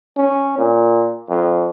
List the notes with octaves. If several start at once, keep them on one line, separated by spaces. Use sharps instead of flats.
C#4
A#2
F2